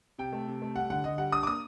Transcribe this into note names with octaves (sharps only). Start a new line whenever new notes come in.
C3 G5
A3
C3
A3
G3 F#5
D3 F#5
D3 D#5
G3 F#5
D4 D#6
D6
A#3 D#6